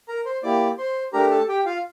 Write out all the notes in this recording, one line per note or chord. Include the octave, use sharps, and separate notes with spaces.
A#4 A#5
C5 C6
A#3 E4 G4 D5 D6
C5 C6
A3 D4 G4 A#4 A#5
A4 A5
G4 G5
F4 F5